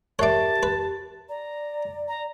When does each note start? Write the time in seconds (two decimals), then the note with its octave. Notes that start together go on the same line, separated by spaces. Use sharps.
0.19 G4 A#4 C#5 D5 E5 A5
0.63 B4
1.29 D5 A#5
2.08 A#5